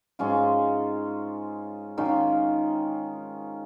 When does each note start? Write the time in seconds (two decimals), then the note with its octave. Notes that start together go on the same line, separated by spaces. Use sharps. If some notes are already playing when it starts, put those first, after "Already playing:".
0.19 G#2 G#3 C#4 F4
1.97 D#3 C#4 F4